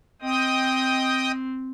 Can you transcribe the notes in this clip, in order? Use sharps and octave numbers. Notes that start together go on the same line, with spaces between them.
C4 D#5 G5 D#6